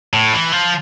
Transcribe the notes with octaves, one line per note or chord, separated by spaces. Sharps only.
A2
E3
F3